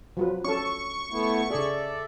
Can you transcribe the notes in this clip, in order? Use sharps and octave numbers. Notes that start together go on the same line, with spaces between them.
F3 F#3 B4
C#4 A4 C#6
A3 B3 E4
C#3 G#4 A4 D5 E5